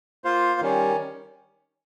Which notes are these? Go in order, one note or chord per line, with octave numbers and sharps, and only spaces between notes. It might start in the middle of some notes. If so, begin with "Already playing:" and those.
A#3 F4 C5 F5
D#3 G3 C#4